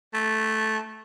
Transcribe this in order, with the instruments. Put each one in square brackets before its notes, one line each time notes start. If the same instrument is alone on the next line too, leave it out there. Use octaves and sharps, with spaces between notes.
[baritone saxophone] A3